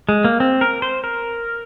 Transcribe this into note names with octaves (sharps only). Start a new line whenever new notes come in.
G#3
A#3
C4
A#4
C5
A#4